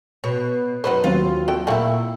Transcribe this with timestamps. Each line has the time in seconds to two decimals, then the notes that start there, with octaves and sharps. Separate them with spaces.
0.24 B2 C#5
0.84 F#2 D#4 F#4 B4 C5
1.04 D#2 F#3 C4 F4
1.48 F#4 A4 G5
1.67 A#2 A3 A#3 E4 F#4 E5 G5